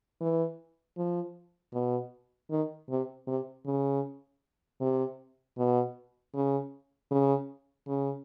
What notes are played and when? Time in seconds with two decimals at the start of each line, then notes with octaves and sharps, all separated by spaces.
0.21 E3
0.97 F3
1.74 B2
2.51 D#3
2.90 C3
3.27 C3
3.66 C#3
4.81 C3
5.58 B2
6.34 C#3
7.11 C#3
7.88 C#3